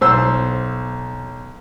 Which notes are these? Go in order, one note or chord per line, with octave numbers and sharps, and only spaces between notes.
B1 C5 E6